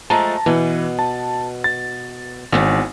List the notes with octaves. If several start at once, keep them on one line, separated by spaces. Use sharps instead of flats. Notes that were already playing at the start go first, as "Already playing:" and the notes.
F3 G#3 A3 A5 A#5
B2 E3 B3
A5
A6
G#1 C#3 E3 B3